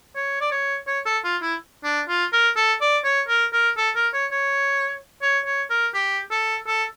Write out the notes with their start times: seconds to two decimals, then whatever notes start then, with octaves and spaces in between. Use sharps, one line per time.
0.16 C#5
0.41 D5
0.51 C#5
0.87 C#5
1.05 A4
1.24 F4
1.42 E4
1.84 D4
2.08 F4
2.33 A#4
2.56 A4
2.81 D5
3.04 C#5
3.29 A#4
3.53 A#4
3.77 A4
3.95 A#4
4.13 C#5
4.31 C#5
5.22 C#5
5.46 C#5
5.70 A#4
5.94 G4
6.31 A4
6.67 A4